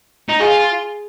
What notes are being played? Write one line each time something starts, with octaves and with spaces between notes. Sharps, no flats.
D#4
F4 G#4